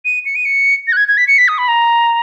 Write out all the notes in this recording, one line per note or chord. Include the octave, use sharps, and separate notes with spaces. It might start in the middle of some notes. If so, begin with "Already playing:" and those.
D#7
C#7
D#7
C#7
A#6
F#6
G#6
G#6
B6
C#7
B6
D#6
B5
A#5